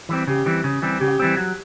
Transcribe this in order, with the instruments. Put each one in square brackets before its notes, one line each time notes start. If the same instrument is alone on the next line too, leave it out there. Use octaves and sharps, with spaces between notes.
[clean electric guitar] E3 G3 C4
[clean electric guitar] C#3 [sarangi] G4
[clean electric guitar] E3 G3 C4
C#3
E3 G3 C4
[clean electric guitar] C#3 [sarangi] G4
[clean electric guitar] E3 G3 C4
F#3